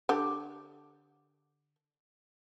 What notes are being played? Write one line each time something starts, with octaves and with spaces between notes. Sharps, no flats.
D3 G4